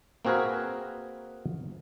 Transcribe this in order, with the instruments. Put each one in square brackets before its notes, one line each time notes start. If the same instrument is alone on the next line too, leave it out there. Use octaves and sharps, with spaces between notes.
[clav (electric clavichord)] A#3 C4 F#4 G#4 A#4 B4